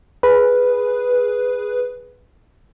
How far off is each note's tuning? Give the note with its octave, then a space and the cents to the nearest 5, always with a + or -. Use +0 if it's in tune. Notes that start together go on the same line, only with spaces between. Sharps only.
G#4 +0 B4 +0